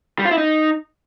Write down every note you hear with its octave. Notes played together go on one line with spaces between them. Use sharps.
G3
F4
E4
D#4